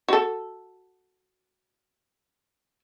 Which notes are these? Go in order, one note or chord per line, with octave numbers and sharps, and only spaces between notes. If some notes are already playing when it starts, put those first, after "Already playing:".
F#4 A4